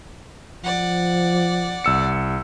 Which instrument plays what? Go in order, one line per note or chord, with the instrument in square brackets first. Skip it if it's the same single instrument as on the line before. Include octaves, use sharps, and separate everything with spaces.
[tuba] F3 [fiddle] D5 F#5
[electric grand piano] C2 E6 C#7